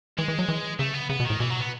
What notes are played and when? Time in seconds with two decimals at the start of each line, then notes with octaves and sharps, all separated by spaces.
0.18 E3 G#3
0.28 E3
0.39 F#3
0.49 E3
0.79 C#3 A3
0.94 B3
1.09 C#3 B3
1.20 B2
1.25 A2 D#3
1.40 B2 E3
1.50 F#3
1.60 B3